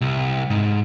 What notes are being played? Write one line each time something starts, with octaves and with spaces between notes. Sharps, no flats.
C2
G#2